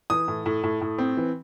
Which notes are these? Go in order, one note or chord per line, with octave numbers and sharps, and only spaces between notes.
E3 D#6
A2
A2
A2
A2
C4
E3